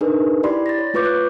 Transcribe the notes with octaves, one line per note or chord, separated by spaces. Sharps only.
D4 D#4 G#4 A#4 B4
E4 G4 D5 B5 C6
A6 A#6
C#5
A3 F4 B4 C#6 D6 G6
F#6